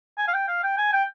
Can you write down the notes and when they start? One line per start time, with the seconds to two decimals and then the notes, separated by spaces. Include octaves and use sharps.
0.18 G#5
0.28 F5
0.34 G5
0.48 F5
0.63 G5
0.78 G#5
0.93 G5